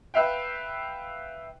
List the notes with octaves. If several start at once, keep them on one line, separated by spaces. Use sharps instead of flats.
B4 E5 F5 G5